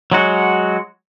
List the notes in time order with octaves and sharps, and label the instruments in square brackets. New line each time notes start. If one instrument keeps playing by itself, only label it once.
[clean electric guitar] F#3 G#3 F#4